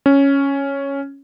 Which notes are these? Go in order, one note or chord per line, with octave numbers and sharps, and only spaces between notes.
C#4